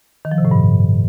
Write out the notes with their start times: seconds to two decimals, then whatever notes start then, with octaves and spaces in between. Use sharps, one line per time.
0.25 D#3
0.31 F3
0.38 C3
0.45 A2
0.51 G2